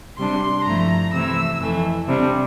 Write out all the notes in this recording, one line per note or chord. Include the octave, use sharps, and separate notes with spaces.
C3 G3 D4 C6
G2 F3 A3 E4 A#5
C3 E3 A3 E4 E6
F2 E3 A3
C3 G3 D4